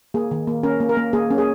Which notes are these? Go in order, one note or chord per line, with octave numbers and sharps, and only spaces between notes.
A#3 G#4
D#3
A#3
C#4 A#4
A#3
A#4
A#3
A#3 G#4
C#4
G#4